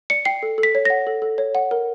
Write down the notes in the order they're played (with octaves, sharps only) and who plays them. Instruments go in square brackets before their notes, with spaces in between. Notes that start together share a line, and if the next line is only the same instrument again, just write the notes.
[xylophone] D5 C#7
G5 C7
A4
A4
B6
C#5
F#5 A#6
A4
A4
C#5
F#5
A#4